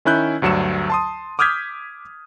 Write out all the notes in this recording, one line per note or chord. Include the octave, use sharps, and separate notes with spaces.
D#3 C#4 E4 F#6 G6
D2 G2 F#3 C#7 E7
A5 C6 D#6
D6 D#6 F6 G6 G#6 B6